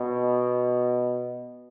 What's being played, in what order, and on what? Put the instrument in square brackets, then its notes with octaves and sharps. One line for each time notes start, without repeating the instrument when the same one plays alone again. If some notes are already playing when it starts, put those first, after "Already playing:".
Already playing: [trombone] B2